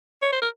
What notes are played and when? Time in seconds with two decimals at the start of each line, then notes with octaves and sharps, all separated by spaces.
0.22 C#5
0.32 C5
0.42 A#4